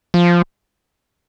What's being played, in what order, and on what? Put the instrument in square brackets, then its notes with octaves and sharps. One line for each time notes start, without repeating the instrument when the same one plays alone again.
[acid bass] F3